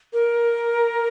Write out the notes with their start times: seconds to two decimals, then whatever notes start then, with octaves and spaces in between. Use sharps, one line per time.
0.13 A#4